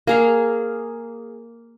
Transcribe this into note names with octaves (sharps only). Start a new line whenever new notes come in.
A#3 G#4 F5